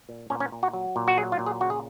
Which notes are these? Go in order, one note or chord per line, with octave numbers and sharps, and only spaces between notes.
A#2
A#2 C#4
C#4
A#2
F#4
F#3
A#2
F#4
F#3 G#4
F4
A#2
G#4
C#3 F#4
G#4